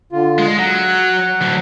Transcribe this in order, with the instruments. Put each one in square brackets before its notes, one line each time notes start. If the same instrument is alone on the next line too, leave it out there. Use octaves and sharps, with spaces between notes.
[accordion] D3 F4
[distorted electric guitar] G#3
[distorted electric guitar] F#3 [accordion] F#5
[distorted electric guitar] D2 F#3